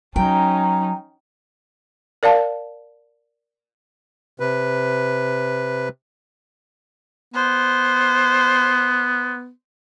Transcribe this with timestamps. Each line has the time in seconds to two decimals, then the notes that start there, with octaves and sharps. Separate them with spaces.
0.16 F#3 C#4 D#4 G5 A#5
2.23 A#4 D5 F5 A5
4.40 C3 B4
7.34 B3 C5